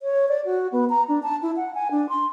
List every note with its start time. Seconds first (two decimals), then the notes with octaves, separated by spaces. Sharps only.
0.01 C#5
0.28 D5
0.45 F#4
0.72 B3
0.90 A#5
1.08 D4
1.23 A5
1.42 E4
1.57 F#5
1.75 G#5
1.91 D4
2.09 C6